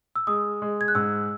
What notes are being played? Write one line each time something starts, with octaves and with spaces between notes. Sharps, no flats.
E6
G#3 D#6
G#3
G#6
F#6
G#2 E6